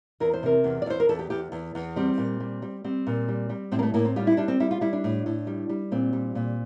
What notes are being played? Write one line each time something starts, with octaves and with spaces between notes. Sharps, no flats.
E2 A#4
C5
C3 A#4
E2
D5
E2 C5
A#4
E2 A4
G4
E2 G4
E2
E2
G3 C4
A#2
G3
G3
G3 C4
A#2
G3
G3
A2 C4
A#3
A3
A2 A#3
C4
G3 F4
E4
G3 D4
C4
G3 E4
F4
G3 E4
D4
A2
A2
G3
G3
A#2 C4
G3
A#2